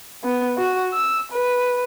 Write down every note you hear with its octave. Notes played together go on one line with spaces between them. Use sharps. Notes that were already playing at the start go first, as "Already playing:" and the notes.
B3
F#4
E6
B4